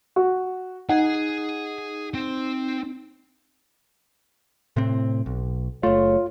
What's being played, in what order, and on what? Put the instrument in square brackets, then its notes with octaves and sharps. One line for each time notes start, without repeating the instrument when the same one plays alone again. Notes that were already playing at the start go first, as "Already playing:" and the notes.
[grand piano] F#4
[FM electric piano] D#4 [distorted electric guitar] G#4 G#5 [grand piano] F#5
[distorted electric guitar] C4
[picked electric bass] A2 C3 C4
B1
[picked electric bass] F#1 A3 [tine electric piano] F4 [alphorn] C#5